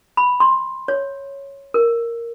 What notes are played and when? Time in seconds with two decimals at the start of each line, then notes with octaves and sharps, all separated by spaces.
0.17 B5
0.40 C6
0.88 C#5
1.74 A#4